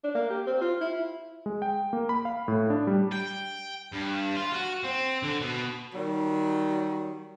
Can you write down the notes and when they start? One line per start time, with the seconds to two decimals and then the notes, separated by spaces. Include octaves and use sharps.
0.04 D4
0.15 A#3
0.30 G4
0.47 C4
0.61 F4
0.81 E4
1.46 G#3
1.62 G5
1.93 A#3
2.09 B5
2.25 F5
2.48 A2
2.70 D4
2.87 G3
3.12 G5
3.92 G2
4.35 F4
4.53 F#4
4.83 C4
5.23 D3
5.41 B2
5.93 D#3 F#3 G3